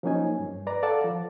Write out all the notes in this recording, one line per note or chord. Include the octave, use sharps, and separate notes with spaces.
F3 F#3 A#3 C#4 D#4 G#5
G2
B4 D5 A#5
A4 D5 F5 F#5 A5
F3